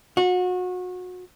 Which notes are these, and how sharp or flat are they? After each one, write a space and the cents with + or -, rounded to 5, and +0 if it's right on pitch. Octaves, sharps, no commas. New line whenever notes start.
F#4 -30